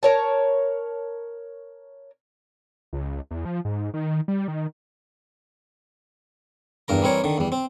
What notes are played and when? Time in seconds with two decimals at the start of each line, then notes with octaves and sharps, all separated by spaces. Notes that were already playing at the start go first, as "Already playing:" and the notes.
0.03 A#4 C#5 A5
2.93 C#2
3.31 E2
3.45 F3
3.65 G#2
3.94 D#3
4.28 G3
4.48 D#3
6.88 E2 G2 A#4 A#5
7.02 E3 G3 C4 A#4 C#5
7.24 D3 D#3
7.38 E2 G3
7.52 C4